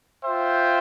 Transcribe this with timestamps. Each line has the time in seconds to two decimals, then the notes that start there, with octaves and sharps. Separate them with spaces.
0.24 F4 C5 E5 G5